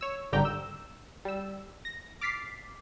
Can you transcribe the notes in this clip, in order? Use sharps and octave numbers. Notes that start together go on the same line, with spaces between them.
C#5 E6
G#1 G2 D3 G4 G5 A#5
E6
G3 E6
A#6
D6 F6 A6 B6 C7